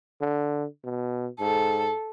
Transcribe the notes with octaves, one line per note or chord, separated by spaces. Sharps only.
D3
B2
G#2 A4